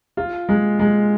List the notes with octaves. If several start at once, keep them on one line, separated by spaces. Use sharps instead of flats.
F4
G#3
G#3